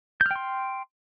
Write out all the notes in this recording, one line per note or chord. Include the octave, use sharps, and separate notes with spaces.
G5 C6 F6 G6